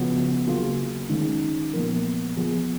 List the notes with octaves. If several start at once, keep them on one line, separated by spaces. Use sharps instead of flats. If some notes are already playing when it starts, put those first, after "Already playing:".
Already playing: C#3 F3 B3 F#4
C#3 F#3 A#3 F4 G#4
D#3 G#3 C#4
A#2 F3 B3 F4 A#4
F3 B3 F4 G#4